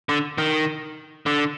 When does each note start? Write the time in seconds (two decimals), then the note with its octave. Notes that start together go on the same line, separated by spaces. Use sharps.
0.09 D3
0.38 D#3
1.26 D3